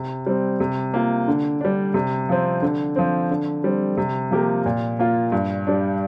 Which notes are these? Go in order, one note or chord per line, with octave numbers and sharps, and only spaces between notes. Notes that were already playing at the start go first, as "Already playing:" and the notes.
Already playing: C3
G3 C4
C3
A#3 F4
D3
G3 D4
C3
F3 C4
D3
F3 C4
D3
G3 C4
C3
F3 A#3 G4 A#4
A#2
A#3 F4
G2
G3 D4